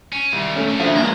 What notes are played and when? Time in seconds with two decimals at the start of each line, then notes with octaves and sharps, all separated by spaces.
0.12 C#4
0.33 C2 G#2 D#3
0.56 A3 C#4
0.68 D2 D3
0.80 F3 D4 E5
0.96 G#3 A#3 A#5